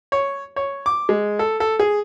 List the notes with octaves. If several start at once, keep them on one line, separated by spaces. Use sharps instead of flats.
C#5
C#5
D6
G#3
A4
A4
G#4